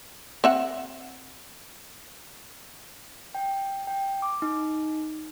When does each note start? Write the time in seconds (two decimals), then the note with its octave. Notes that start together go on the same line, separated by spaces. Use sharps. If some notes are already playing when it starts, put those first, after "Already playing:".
0.44 C4 E5 F#5
3.35 G5
3.87 G5
4.22 D6
4.42 D#4